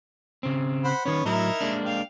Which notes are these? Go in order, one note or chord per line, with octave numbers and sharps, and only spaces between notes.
C#3 C4
C5 F#5 B5
D#3 B3 C#4 C#5
A2 F#3 D#4 E4 A#4
G#3 A#3 D4
F5 G5